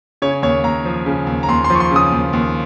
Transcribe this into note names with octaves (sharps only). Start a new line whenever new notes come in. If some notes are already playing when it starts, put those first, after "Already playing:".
C#3 C#5
D#2 C#5
D#2 A#5
F3
C#3
D#2
A#5
D#2 C6
C6
F3
C#6
C6
C#3 D#6
D#2
D#2